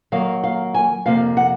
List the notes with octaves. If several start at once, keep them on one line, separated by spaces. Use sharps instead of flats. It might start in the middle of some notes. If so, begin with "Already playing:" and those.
D#3 F#3 A#3 F5
F5
G#5
F2 C3 F3 A#3 F5
F#5